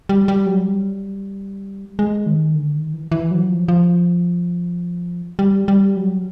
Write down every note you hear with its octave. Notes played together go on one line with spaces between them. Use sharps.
G3
G3
F#3
G3
G#3
D#3
D3
D#3
E3
E3
F#3
F3
F3
G3
G3
F#3